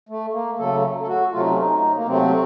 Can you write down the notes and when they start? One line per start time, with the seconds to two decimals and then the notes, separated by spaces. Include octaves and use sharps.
0.09 A3
0.33 A#3
0.59 C#3 F#3 A3 A4
1.01 A4
1.07 F#4
1.32 C3 F#3 A3 F4
1.41 D#4
1.50 C#4
1.58 D#4
1.95 A#3
2.06 C3 F#3 A3 C4